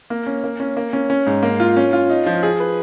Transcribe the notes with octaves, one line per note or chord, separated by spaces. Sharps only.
A#3
C#4
A#3
C#4
A#3
C#4
C#4
G#2
A#3
F4
C#4
F4
D#4
F3
G#4
B4